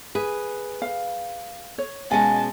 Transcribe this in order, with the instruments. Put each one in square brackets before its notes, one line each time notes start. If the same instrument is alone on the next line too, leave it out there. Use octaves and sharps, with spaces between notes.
[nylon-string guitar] G#4 B4
[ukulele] F5
C#5
[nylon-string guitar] B2 G#3 C#4 [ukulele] F5 G#5 [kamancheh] A5